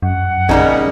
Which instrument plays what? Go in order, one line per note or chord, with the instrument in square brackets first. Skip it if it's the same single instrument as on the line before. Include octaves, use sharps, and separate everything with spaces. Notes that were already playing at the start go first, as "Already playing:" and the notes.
[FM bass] F#2 [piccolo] F#5
[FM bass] A#1 [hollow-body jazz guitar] C#3 G3 A#3 [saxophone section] D#4